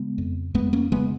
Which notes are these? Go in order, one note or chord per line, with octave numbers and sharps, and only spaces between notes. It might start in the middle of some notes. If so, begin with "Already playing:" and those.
Already playing: C#3 G#3 B3
F2
F2 G#3 B3
A#3 C#4
C#3 G#3 B3